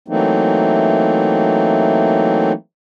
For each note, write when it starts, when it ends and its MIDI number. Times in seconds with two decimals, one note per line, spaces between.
0.08 2.52 52
0.08 2.52 54
0.08 2.52 57
0.08 2.52 58
0.08 2.52 60
0.08 2.52 63